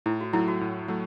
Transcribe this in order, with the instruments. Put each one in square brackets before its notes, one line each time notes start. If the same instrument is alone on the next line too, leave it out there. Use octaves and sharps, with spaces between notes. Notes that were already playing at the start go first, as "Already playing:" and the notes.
[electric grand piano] A2 [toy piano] E4
[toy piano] F#4
[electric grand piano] F#3 A3 [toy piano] E4
[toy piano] F#4
[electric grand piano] A2
F#3 A3